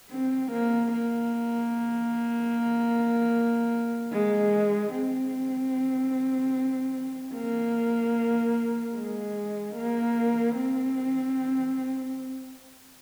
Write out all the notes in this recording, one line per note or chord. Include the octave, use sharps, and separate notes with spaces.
C4
A#3
A#3
G#3
C4
A#3
G#3
A#3
C4